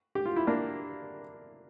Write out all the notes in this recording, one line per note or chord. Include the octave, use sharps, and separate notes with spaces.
G4
F4
E4
A#3 D4